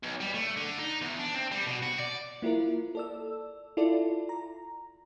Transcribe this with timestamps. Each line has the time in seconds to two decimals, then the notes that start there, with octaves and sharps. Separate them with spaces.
0.03 B1
0.20 G3
0.34 A3
0.57 D3
0.79 D#4
1.02 E2
1.19 D4
1.34 C4
1.52 G3
1.67 B2
1.82 F#4
1.99 D5
2.42 A#3 E4 F4 A#4
2.95 A4 D5 E6
3.77 E4 F4 A4 D5
4.29 A#5